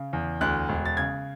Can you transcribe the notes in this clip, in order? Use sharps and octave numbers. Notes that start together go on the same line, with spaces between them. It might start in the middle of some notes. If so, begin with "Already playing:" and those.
Already playing: C#3
E2
D2 F#6
E1
A6
C#3 G#6